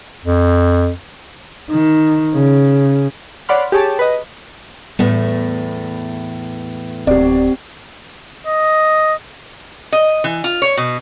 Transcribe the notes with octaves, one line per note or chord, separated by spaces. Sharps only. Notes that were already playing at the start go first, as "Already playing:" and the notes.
F2
D#3
C#3
C#5 D5 F#5 B5 C6 F6
G4 G#4 C#5 A5
B4 D#5
E2 A2 G3 A3 B3
D1 C4 G4 D5
D#5
D#5
E3
F4
C#5
B2